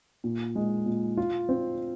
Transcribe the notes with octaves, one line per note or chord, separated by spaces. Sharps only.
A#2
G#3
A#2
F4
C4